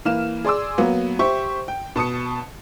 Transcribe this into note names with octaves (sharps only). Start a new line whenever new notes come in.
E3 A#3 F6 E7
G#4 D5 C6 D6 E6
F#3 A#3 B3
G4 C5 E5 C#6
G5
B2 A5 D#6 C#7